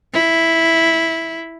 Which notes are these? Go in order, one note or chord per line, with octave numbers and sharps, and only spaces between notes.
E4